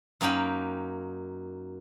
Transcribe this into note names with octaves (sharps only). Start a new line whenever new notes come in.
F#2 A#3 D#4 G5 B5